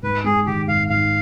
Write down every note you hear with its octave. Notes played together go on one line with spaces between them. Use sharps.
G#2 B4
G#3 G#4
D#3 G4
G#2 F5
G#2 F5